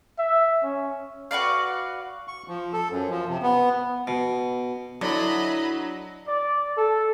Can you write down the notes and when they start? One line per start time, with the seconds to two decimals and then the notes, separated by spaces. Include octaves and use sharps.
0.19 E5
0.63 C#4
1.31 F#4 B4 D5 F5
2.28 C#6
2.48 F3
2.73 A4
2.91 F#2
3.10 F3
3.28 C3
3.43 B3
4.07 B2
5.01 D3 F#3 E4 D#5 B5
6.27 D5
6.77 A4